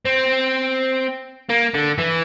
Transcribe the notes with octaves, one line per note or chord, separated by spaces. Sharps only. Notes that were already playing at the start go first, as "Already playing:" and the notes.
C4
A#3
D3
E3